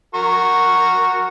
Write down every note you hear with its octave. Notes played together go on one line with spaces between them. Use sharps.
F#4 A#4 C#6